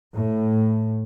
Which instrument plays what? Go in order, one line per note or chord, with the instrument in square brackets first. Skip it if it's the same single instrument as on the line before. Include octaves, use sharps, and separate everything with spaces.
[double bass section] A2